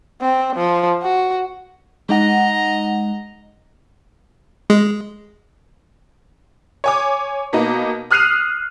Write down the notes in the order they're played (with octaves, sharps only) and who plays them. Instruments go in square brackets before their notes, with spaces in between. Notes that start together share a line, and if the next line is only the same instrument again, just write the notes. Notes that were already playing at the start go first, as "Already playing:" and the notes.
[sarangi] C4
F3
F#4
[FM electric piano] G#3 D#4 F#5 [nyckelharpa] D#5 A#5
[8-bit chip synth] G#3
[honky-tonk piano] C#5 G#5 D6
B2 A#3 B3 D#4
D#6 F6 F#6 C7 D#7 F7